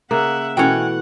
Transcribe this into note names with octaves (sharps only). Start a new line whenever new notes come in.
C#3 A#3 E5 F#5
B2 E3 A3 C#4 F#5 G5